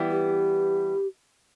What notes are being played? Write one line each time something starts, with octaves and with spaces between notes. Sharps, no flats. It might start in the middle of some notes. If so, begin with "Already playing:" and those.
Already playing: E3 G3 B3 E4
G4